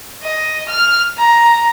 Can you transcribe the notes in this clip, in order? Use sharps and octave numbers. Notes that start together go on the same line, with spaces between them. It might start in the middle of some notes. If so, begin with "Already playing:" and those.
D#5
F6
A#5